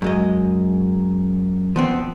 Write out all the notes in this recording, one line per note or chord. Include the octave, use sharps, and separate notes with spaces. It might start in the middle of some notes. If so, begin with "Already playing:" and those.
F#2 G#3 D#5
F3 B3 C4